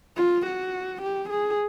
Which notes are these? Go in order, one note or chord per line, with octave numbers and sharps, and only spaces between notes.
F4
F#4
G4
G#4